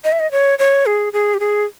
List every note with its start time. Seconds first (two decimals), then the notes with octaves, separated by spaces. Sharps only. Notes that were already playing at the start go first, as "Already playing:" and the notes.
0.04 D#5
0.12 E5
0.20 D#5
0.32 C#5
0.59 C#5
0.86 G#4
1.13 G#4
1.34 G4
1.40 G#4